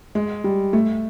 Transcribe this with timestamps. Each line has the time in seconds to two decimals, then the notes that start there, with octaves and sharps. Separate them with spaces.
0.15 G#3
0.44 G3
0.73 A3